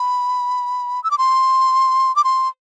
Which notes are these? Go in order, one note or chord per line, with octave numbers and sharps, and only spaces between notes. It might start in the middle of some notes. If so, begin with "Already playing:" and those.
Already playing: B5
E6
D6
C6
D6
C6